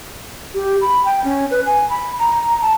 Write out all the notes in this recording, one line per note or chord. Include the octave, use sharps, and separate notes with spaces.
G4
B5
G5
C#4
B4
G#5
B5
A#5
A5